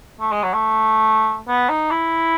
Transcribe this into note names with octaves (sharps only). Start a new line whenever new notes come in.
A3
G#3
F#3
A3
B3
D#4
E4